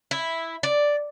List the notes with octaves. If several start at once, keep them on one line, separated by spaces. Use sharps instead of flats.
E4
D5